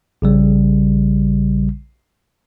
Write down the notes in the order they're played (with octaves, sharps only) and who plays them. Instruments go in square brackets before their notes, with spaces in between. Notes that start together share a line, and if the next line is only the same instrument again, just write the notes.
[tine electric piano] A#1 C#3 G3